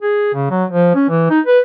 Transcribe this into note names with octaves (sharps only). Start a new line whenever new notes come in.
G#4
C#3
F#3
F3
C#4
E3
D#4
B4